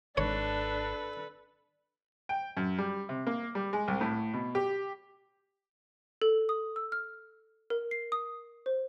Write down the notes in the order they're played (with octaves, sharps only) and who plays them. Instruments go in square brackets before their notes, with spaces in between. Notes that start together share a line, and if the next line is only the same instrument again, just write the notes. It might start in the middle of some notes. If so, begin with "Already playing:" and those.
[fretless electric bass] G#1 [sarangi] D4 [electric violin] A4 B4 [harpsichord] C#5
[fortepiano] G5
F#2
G3
C3
A#3
G3
G#3
C2
A2
B2
G4
[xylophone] A4
D#6
E6
F6
A#4
C7
D#6
C5